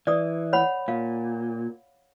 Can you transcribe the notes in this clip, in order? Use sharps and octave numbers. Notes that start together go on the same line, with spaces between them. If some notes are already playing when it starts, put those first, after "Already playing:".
E3 D5 D#6
C#5 F#5 B5
A#2 F5